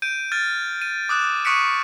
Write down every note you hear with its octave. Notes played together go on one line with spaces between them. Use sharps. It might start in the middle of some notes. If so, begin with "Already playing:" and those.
G6 D7 D#7
F6 G#6 A6 D#7
D#7
D6 D#6 F#6 E7
C#6 D#6 F#6 B6 C#7 D7